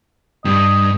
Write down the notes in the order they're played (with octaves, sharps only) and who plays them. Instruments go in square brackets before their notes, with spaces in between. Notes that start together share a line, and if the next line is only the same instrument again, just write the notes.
[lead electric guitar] G2 [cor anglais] D#5